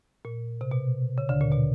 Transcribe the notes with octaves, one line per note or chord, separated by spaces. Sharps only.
A#2
C3
B2
C#3
D2 D3
A#2
B2